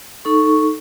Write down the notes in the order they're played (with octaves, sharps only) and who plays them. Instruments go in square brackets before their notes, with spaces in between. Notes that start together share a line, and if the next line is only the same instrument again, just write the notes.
[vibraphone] D#4 A4 C#6